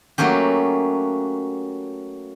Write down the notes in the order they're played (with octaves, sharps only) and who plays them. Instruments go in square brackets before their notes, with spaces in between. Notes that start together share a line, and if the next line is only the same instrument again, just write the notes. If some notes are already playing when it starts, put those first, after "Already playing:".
[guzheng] F#3 A3 A#3 C#4 G4